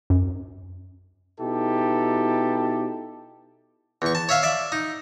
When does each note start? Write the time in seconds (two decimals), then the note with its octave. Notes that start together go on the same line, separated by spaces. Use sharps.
0.10 F#2
1.40 B2 D#4 E4 G4 A4
4.02 E2 C#6
4.15 A5
4.29 C#5 E5 F5
4.43 D5 E5
4.72 D#4